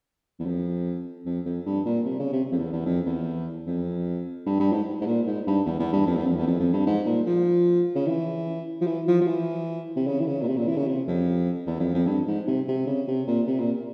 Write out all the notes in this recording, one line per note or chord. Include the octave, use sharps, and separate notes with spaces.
E2
F2
F2
F2
G2
A#2
C3
C#3
C3
F2
E2
E2
F2
E2
F2
G2
G2
G#2
G#2
A#2
G#2
G2
E2
E2
G2
F2
E2
F2
E2
F2
F2
G2
G#2
A#2
F3
C#3
E3
F3
E3
F3
F3
E3
C3
C#3
E3
C#3
A#2
C3
A#2
E3
C#3
C3
F2
E2
F2
F2
G2
G#2
C3
C3
C#3
C3
A#2
C3
A#2